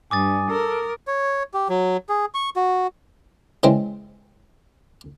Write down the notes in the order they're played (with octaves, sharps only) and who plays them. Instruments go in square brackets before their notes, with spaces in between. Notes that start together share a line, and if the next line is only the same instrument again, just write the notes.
[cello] G2 [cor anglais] G#5 [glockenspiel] D6 D#6 A6
[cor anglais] A4 [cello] A#4
[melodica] C#5
G4
F#3
G#4
C#6
F#4
[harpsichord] C#3 E3 G#3 C4